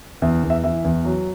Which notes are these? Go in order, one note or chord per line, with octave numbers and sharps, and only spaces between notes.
E2 E5
E2
E5
E3 E5
E2
F#3